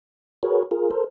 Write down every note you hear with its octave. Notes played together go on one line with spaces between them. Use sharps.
F#4 G#4 A#4 B4 C#5
F4 G#4 A#4
A4 A#4 C5